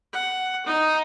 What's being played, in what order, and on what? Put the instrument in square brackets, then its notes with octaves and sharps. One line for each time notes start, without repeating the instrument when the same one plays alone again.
[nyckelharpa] F#5
D#4